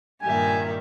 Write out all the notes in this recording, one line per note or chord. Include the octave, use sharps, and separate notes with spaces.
G2 A#2 D#3 G4 E5 G#5